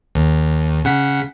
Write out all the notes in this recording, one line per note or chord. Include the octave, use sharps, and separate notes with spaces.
D#2
C#3 F#5 B6